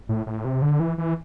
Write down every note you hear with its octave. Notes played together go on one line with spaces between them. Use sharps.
A2
A2
C3
D3
E3
E3